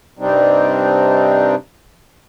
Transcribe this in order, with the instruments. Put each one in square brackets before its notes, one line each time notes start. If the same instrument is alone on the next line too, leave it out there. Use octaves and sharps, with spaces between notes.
[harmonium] G2 C3 G3 C4 D4 D#4